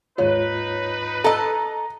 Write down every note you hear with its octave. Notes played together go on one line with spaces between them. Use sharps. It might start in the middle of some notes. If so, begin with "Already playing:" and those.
D#2 G#2 D#4 F4 B4 C#5
A4 D#5 A#5